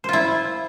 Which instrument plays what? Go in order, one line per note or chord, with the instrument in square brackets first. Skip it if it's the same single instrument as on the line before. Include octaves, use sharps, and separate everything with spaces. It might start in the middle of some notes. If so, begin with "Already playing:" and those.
[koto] C5
F4
E4